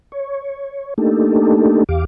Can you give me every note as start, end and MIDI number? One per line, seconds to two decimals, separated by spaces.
0.12 0.94 73
0.98 1.84 57
0.98 1.84 58
0.98 1.84 62
0.98 1.84 63
0.98 1.84 67
0.98 1.84 69
1.89 2.05 40
1.89 2.05 67
1.89 2.05 77
1.89 2.05 86